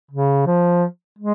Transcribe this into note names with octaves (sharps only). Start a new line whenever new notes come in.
C#3
F3
G#3